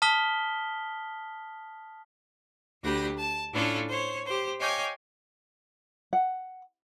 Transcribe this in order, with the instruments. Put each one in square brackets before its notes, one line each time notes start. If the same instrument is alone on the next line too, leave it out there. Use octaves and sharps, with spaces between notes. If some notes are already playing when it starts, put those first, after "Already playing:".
[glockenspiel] A5 D#6 F6 B6 G7
[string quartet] D2 D4 G4 B5 A#6
A5
A2 C#4 D4 E4 F4 A4
C5 C#5
G4 C5
C#5 D#5 F5 G5 G#5 D6
[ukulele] F#5